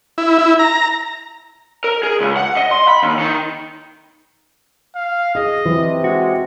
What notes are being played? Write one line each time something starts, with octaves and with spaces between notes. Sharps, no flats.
E4
E4
A#5
A#4
G#4
C#2
F#5
D#5
C6
B5
D#2
D#3
F5
G#4 D#5
C3 E3
G#3 F#4